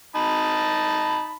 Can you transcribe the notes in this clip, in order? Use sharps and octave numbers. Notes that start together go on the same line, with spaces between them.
D#4 A5 B5